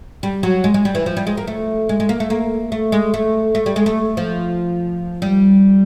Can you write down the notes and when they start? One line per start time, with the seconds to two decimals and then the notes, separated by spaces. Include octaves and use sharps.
0.23 G3
0.43 F#3
0.64 G#3
0.74 G#3
0.85 G3
0.95 E3
1.06 F3
1.17 G3
1.27 G#3
1.37 A#3
1.47 A3
1.89 G#3
2.00 G#3
2.09 A#3
2.20 A3
2.30 A#3
2.72 A3
2.92 G#3
3.14 A3
3.55 A3
3.66 G3
3.76 G#3
3.86 A3
4.17 F3
5.22 G3